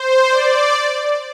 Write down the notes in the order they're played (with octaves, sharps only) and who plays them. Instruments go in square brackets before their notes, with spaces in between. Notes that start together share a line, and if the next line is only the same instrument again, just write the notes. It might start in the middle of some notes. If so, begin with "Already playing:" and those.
Already playing: [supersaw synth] C5
D5